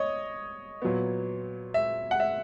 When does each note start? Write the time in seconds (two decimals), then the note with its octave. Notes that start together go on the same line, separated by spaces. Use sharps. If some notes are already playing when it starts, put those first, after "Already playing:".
Already playing: C#5 D#5
0.82 A#2 F#3 B3
1.74 E5
2.11 F#5
2.20 E5